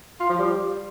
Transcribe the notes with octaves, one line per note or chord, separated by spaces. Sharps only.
F4
F3
G3